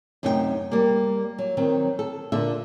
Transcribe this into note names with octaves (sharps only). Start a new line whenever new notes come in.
F#2 C3 A3 D#4 F4 G5
G3 A#3
F#3
D#3 F#3 C4
A4
A#2 D3 E5